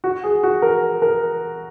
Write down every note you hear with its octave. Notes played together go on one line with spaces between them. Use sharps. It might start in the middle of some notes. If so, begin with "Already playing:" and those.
F#4
G#4
F#4
A#4
A#4